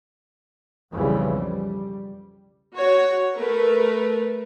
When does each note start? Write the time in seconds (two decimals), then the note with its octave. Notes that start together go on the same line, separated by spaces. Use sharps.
0.93 B1 F2 C#3 E3 G3
1.34 G3
2.76 F#4 C#5
3.35 A3 A#4 B4